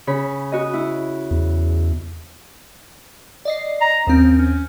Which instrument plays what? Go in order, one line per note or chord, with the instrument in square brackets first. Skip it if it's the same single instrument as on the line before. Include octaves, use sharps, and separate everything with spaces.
[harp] C#3 B5
F#4 D#5
E4
[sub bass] E2
[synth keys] D5 D#5 C7
[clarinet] A#5
[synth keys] D#2 C4 [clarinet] C#4
[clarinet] C#4